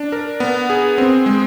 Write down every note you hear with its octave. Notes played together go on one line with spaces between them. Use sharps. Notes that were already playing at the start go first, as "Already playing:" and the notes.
Already playing: D4
A#4
B3
G#4
C4
G#3